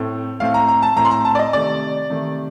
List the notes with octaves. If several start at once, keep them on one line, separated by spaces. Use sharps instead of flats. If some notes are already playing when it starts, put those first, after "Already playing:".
Already playing: A2 A3 C4
A2 A3 C4 F5
A#5
A#5
A5
A2 A3 C4 A#5
C6
A#5
A5
D5
D#5
C3 D#3 A3 D5
C3 D#3 A3